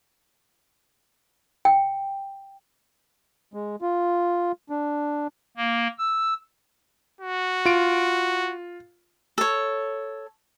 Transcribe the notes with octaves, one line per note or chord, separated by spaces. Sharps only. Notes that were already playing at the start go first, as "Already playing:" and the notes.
G5
G#3
F4
D4
A#3
E6
F#4
F4 D7
A4 C#5